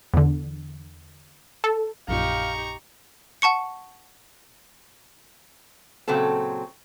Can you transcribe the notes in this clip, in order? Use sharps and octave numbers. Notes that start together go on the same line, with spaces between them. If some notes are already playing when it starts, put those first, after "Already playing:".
E2 D3
A4
A#1 F#2 A#2 D#4 G4 F5 A#5 C#6
F#5 A5 C#6 C#7
A#2 C#3 F#3 C4 A4